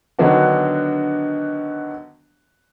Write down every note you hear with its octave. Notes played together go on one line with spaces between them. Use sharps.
D3 D#3 F#3 B3 D4 F#4